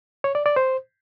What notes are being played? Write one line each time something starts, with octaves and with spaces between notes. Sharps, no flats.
C#5
D5
D5
C5